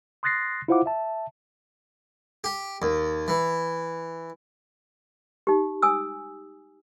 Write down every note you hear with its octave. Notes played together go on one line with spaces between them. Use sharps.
C6 D#6 F#6 A6 A#6 C7
E4 F4 C5 F5 F#5 D6
E5 A5
G4
D#2
E3
D#4 G4
G#5 D#6 E6